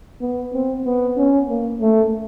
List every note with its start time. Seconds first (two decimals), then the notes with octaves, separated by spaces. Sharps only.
0.21 B3
0.53 C4
0.85 B3
1.17 C#4
1.49 A#3
1.81 A3